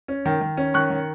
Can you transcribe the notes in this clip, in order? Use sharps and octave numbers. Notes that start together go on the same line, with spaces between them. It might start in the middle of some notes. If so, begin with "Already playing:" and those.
C#4
D#3
D#3
C#4
D#3 C#6 F#6
D#3